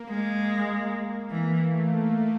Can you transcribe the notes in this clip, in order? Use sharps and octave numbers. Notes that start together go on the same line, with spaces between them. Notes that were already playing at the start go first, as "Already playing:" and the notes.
Already playing: A#3
G#3
E3 A#3
A3